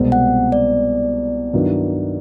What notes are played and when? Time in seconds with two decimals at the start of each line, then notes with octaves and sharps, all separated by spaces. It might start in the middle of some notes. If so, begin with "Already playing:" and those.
Already playing: C2 B2 G#3 C4
0.12 F#5
0.52 D5
1.53 G2 D#3 F#3 B3 E4